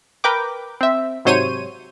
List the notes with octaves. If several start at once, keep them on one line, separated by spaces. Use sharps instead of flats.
A#4 B4 G5 D6
C4 E5
G#2 C3 F#3 C5 C#5 D#7